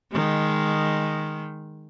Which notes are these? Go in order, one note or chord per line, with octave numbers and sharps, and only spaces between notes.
D#3 G#3